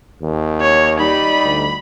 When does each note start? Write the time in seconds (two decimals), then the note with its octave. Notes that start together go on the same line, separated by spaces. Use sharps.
0.22 D#2
0.61 C#5
1.00 G3 D#4 B5
1.44 D2